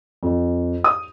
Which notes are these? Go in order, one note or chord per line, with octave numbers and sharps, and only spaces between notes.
F2
D#6